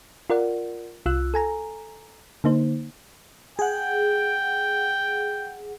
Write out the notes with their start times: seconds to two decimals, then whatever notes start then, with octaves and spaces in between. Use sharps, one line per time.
0.30 F4 A#4 D5 F#5
1.06 C2 F4 E6 F#6
1.34 A4 G#5 A#5
2.44 D3 A#3 D#4 C5
3.59 G#4 F#5 G5